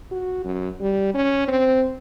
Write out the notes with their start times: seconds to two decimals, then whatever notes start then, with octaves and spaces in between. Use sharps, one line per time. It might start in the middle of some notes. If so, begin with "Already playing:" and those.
0.11 F#4
0.44 F#2
0.81 G3
1.14 C#4
1.48 C4